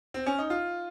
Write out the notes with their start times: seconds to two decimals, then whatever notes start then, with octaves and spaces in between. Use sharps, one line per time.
0.14 C4
0.26 C#4
0.38 D#4
0.50 F4